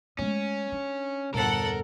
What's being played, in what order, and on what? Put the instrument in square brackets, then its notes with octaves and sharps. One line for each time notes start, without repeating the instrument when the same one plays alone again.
[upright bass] G#3 A3 [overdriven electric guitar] C#4
[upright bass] D4
[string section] G1 A4 F#5 [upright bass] E2 A#2 [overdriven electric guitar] A#4